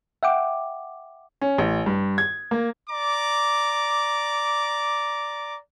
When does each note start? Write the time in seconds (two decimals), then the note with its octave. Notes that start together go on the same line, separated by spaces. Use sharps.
0.23 E5 F#5 G5 D6
1.41 C#4
1.58 A1
1.86 G2
2.18 G#6
2.51 A#3
2.90 D5 A#5 D6